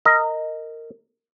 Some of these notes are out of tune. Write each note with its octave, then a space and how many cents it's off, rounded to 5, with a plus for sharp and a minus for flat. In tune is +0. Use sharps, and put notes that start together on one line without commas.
A#4 -20 D#5 +5